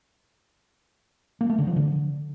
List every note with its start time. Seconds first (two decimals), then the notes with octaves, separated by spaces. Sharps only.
1.41 A#3
1.50 A3
1.58 D3
1.67 F3
1.76 D3